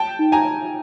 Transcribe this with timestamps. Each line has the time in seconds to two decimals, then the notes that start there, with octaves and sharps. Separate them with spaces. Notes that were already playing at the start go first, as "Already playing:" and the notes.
Already playing: G5 A5
0.19 D#4
0.32 G#5 A#5
0.45 C#5